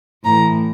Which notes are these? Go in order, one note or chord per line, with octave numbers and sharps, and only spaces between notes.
A2 E3 A#5